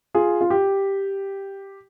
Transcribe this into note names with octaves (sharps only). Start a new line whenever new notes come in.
F4 G#4
F4
G4